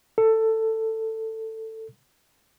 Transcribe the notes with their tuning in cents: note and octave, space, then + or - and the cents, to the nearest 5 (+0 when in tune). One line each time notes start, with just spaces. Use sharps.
A4 +15